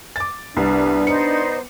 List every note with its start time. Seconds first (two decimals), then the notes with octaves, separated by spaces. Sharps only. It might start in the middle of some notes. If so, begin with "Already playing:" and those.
0.16 D6 A6
0.57 C2 B3 D4
1.07 D#4 C5 D5 C#7